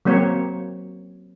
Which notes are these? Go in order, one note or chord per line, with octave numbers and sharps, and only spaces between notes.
F#3 A#3 C4 C#5